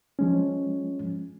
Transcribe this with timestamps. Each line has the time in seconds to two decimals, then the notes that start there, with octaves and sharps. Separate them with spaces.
0.19 F3 G#3 C#4